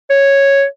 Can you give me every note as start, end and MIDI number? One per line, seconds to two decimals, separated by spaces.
0.10 0.65 73